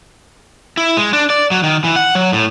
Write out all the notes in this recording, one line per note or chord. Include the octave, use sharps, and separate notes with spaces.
E4
G#3
D4
D5
F#3
D#3
E3
F#5
F#3
A2